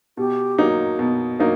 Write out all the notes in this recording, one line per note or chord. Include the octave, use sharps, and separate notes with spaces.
B2 G4
F#3 A#3 D#4
B2
F#3 A#3 D#4